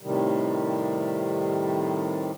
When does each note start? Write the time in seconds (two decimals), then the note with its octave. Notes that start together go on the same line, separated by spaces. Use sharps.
0.01 A2 C3 D#3 G3